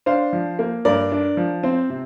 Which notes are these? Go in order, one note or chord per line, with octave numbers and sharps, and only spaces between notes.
D4 C5 F5
F3
A#3
G2 A#4 D5
D4
F3
C4 C5
C3